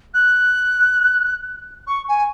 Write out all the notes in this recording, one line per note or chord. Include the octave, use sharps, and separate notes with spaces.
F#6
C#6
G#5